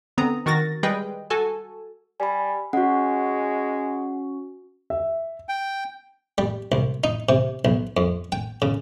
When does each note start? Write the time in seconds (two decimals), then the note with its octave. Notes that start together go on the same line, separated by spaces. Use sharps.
0.17 D3 B3 C4 A#5 D#6
0.46 D#3 F#4 A#4 A6 A#6
0.83 G3 G#3 G#4 B4 D#5 G5
1.30 F#4 A4 G#5 A5
2.20 G3 G#5 B5
2.73 G#3 C#4 F#4 F#5
4.90 E5
5.49 G5
6.38 G3
6.72 C2
7.04 D#4
7.29 C3
7.65 B1
7.97 F2
8.32 G5
8.62 C#3